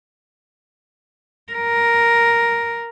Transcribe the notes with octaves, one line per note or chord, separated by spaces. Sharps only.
A#4